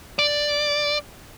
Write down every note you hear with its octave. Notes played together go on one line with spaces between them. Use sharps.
D5